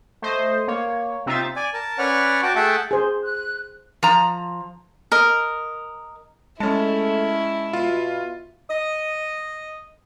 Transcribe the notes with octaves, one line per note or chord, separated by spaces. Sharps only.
A3 C5 D#5
A#3 C#5
C3 C4 D#4 F4 E5 A6
D5 G#5
A#4 A5
C#4 B4 C#5 D5 F#5 F6
F#4 G5 A5 D6
A3 G#4 E5 F#5 G5 A5
G#4 C5
F#6
F3 A#5
A#4 D#5
G#3 A3 C#4 E4 A5
B2 F4
D#5